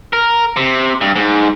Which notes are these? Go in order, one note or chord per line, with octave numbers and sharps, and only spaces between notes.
A#4
C3
G2
G#2